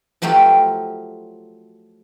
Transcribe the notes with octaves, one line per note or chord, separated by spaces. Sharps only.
F3 F#3 A3 F4 G4